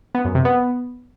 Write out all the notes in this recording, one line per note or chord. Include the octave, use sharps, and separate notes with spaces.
B3
F#2
C3
B3